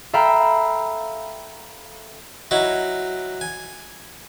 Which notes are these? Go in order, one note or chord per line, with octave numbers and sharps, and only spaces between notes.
A4 E5 F5 G5 A#5 B5
F#3 D#4 E4
G#5